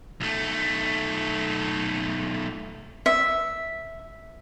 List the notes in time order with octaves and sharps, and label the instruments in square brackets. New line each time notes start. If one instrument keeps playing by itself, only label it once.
[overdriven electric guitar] B1 A3
[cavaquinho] E5